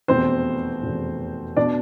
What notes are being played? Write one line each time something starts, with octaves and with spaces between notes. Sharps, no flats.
F1 E2 B2 C4 C5
F1 E2 B2
B2 D4 D5